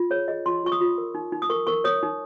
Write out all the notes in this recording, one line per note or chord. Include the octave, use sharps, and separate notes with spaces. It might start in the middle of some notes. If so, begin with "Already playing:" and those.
Already playing: F4
G#4 C#5
G#4 D#5
F4 C6
F4 C#6
D#6
F4
A#4
D#4
D#4
D#6
A#4 C#6
A#4 C#6
C#5 D#6
D#4